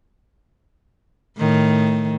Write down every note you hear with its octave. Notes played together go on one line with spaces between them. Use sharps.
A2 D#3